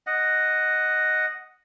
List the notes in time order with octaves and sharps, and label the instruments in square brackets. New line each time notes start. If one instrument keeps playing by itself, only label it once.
[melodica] D#5 F#5